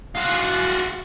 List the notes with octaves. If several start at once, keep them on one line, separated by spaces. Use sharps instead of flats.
F4 F#4